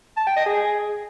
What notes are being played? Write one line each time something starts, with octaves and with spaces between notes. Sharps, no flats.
A5
G5
D#5
G#4